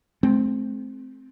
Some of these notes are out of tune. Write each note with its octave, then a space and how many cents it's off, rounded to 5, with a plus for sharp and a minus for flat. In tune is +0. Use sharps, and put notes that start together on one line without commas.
A3 -40 C4 +0